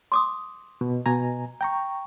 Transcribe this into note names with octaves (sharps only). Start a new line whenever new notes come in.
C6 D6 D#6
B2
B2 G#5 A#5
G5 A#5 C#6